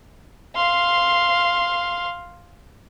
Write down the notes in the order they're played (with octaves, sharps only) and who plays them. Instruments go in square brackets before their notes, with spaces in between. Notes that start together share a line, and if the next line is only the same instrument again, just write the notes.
[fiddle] F5 C6